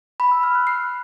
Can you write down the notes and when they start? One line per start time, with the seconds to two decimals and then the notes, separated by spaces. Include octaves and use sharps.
0.20 B5
0.31 E6
0.43 F6
0.55 F#6
0.67 C7